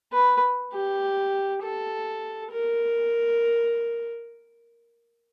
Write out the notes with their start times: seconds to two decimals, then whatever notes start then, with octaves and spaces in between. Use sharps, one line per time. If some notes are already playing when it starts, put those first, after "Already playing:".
0.13 B4
0.74 G4
1.62 A4
2.51 A#4